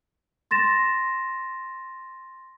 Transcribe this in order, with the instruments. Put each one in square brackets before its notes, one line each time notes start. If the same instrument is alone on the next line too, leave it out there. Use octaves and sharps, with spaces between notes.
[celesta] C6 A6 A#6 E7